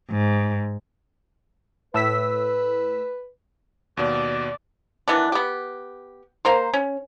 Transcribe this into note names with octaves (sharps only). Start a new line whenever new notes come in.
G#2
A2 B4 E6 B6
D#2 B2 D5
D#3 E3 B3 D4
B3 G4
A#3 A#4 C5
C#4